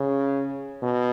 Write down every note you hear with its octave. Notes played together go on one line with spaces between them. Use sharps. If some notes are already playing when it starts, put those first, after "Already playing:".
Already playing: C#3
B2